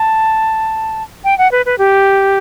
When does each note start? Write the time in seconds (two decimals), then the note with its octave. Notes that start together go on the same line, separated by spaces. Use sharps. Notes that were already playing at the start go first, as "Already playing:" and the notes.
Already playing: A5
1.24 G5
1.38 F#5
1.52 B4
1.66 B4
1.78 G4